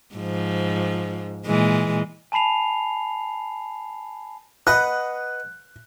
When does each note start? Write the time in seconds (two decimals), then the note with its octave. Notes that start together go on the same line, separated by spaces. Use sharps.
0.15 G#2 F3
1.46 A#2 E3 G#3
2.32 G#5 A5 B5 C7 F7
4.67 B4 D#5 F#5 F#6